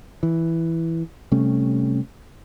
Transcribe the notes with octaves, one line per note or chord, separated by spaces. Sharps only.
E3
C3 G3 A3 C#4